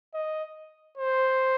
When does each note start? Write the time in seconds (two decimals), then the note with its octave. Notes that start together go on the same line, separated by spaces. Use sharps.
0.14 D#5
0.98 C5